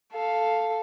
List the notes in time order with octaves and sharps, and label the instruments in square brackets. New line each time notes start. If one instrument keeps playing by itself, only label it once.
[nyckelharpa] A4 F5